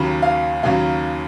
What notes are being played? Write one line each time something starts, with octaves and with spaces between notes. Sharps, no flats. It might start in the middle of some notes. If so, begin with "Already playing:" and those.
Already playing: D#2 C#3 F#3 B5
F5
D#2 C#3 F#3 F5